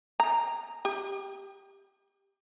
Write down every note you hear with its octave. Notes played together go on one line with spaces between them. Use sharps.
A#5
G4